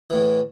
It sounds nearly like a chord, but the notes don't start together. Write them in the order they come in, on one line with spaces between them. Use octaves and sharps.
E3 A2 E2